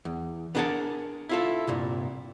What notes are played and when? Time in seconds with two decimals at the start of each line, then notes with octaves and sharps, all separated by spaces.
0.05 E2
0.55 B3 D4 G#4 A#4 F#5 A5
1.29 E4 F4 A4
1.67 C2 G2 A#2